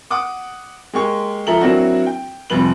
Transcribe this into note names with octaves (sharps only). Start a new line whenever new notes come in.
F#5 D6 D#6
G#3 A#3 G4 C#6
F3 A4 E5 A#5 F#7
F#3 A#3 C4 D4 E4 F#4
G5
F1 F2 G3 B4 F#7